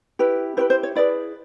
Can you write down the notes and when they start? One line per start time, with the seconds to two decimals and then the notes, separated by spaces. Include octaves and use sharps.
0.19 E4 G4 B4
0.57 E4 G4 B4 C5
0.70 C5
0.83 C#5
0.95 E4 G#4 B4 D5